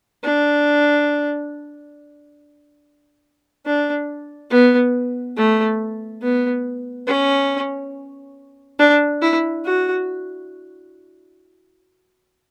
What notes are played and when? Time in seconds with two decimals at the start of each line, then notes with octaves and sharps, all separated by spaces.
0.24 D4
3.66 D4
4.50 B3
5.37 A3
6.22 B3
7.07 C#4
8.79 D4
9.22 E4
9.65 F#4